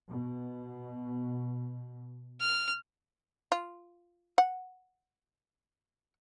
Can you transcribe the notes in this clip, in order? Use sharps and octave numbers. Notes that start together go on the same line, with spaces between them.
B2
F6
F4
F#5